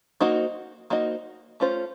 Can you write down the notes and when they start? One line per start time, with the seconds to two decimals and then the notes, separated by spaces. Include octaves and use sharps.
0.20 A#3 D#4 F#4 C5 D#5
0.90 A#3 D#4 F#4 C5 D#5
1.60 A3 C#4 F4 C5